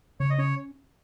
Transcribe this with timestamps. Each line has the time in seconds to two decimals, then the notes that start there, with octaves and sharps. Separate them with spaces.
0.20 C#3 C#5
0.30 D#5
0.38 C#4 C#5